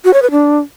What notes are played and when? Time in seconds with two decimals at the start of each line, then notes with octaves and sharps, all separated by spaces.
0.05 F#4
0.14 C#5
0.22 B4
0.31 D4